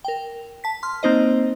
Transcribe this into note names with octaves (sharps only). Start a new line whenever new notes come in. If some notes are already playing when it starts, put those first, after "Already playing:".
A#4 G5
A5 B6
C6 F6
A#3 C4 D#4 C5 D#5